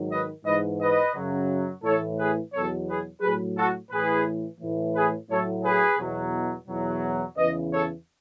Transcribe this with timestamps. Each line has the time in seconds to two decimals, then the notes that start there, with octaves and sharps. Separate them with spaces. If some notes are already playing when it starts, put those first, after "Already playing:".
Already playing: G#2 D#3 F#3
0.11 B4 D#5
0.45 G#2 E3 B4 D#5
0.80 B4 D#5
1.15 F#2 C#3 F#3
1.83 A2 E3 A4 C#5
2.18 G#4 B4
2.52 E2 B2 F#3 A4 C#5
2.87 G#4 B4
3.22 A2 F#3 G#4 B4
3.57 F#4 A4
3.91 A2 E3 G#4 B4
4.60 A2 E3
4.95 G#4 B4
5.30 A2 F#3 A4 C#5
5.64 G#4 B4
5.99 E2 B2 F#3
6.68 E2 B2 F#3
7.37 E2 C#3 E3 B4 D#5
7.71 A4 C#5